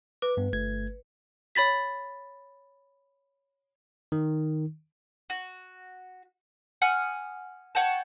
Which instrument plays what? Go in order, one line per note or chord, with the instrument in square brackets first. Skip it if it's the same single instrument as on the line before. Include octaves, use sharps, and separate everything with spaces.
[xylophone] B4 [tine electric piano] D6
[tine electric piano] G2 B3
G1 A3 G#6
[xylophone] C#5 B5 A6 B6
[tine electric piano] D#3
[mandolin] F#4
F#5 G#5 D#6 F6
C#5 F#5 G5 A5